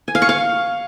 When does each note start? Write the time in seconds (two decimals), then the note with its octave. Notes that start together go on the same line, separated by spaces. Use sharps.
0.08 G#5
0.15 F5
0.22 C#6
0.29 F5